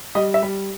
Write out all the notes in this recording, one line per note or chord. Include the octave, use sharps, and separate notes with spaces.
G3 D#5
E5
G3